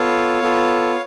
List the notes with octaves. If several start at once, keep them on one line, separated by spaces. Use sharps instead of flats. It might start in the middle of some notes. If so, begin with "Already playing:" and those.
Already playing: B3 F4 A4 C#5 F5
B3 F4 A4